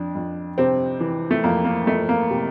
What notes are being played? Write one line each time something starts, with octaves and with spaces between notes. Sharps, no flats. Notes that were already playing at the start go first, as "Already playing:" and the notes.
Already playing: F2 D4
F2
C3 C4
E3
A3
F2 A#3
A#3
F2 A3
A#3
C3